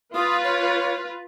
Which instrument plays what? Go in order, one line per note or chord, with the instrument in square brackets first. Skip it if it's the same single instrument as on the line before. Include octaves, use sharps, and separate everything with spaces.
[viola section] F4 B4 [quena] D#6
[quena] C#5